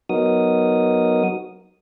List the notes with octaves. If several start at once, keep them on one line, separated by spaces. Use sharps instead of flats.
F#3 B3 D#4 F#4 A#4 D#6